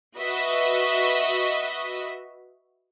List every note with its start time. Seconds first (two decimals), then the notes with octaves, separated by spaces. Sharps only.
0.17 F#4 B4 D#5 E5